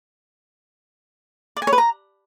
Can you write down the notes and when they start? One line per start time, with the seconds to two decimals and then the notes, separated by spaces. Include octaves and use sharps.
1.57 D5
1.62 G#5
1.67 C#5
1.73 B4
1.78 A#5